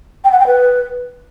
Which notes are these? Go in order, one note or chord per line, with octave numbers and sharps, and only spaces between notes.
G5
F#5
G5
B4